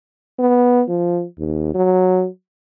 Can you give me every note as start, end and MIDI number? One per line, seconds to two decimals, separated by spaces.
0.39 0.83 59
0.89 1.25 53
1.39 1.73 39
1.74 2.27 54